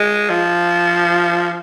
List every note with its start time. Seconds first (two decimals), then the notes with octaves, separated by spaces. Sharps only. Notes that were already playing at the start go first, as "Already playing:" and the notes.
Already playing: G#3
0.30 F3